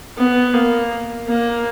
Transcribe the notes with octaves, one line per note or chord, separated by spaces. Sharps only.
B3
A#3
A#3